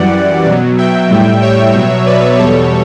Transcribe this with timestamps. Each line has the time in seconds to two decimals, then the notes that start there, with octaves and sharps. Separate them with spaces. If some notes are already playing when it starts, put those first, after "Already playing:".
Already playing: F#2 E3 G3 D5 F#5
0.46 B2 F#3
0.78 E5 G5
1.10 A2 G3
1.42 C#5 E5
1.74 B2 F#3
2.06 B4 D5
2.38 E2 B2 G3 A4 C#5